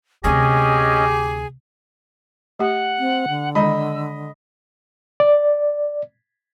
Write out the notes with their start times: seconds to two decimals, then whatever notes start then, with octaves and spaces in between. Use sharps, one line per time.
0.24 D2 C3 C#4 G4 G#4 D#5
2.59 A3 G4 F#5
2.99 C4
3.29 D3
3.55 D#3 G#3 D#5 B5 E6
5.20 D5